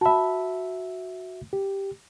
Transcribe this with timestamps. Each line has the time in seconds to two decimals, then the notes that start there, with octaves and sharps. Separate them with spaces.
0.01 F#4 E5 A5 B5
1.53 G4